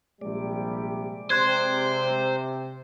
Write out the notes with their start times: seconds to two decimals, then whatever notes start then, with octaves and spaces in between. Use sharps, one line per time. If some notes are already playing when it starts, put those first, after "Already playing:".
0.21 A#1 C3 G3 G#3 D5
1.30 C3 C5 C6 F#6 G#6